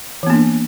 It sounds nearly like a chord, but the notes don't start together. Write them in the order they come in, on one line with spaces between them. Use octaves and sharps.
E3 B3 A#3 D4